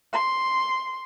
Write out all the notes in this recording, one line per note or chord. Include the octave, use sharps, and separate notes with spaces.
C6